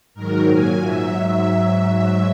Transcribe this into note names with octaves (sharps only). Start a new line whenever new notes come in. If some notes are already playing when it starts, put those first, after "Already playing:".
G#2 D#3 F#3 A#4
A#2 F#3 G#5
G#2 F#3 E5